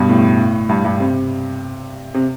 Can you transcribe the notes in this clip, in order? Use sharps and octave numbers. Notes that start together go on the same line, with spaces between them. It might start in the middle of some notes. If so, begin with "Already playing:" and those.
Already playing: G2 B2
A2
G2
G2
C3
C3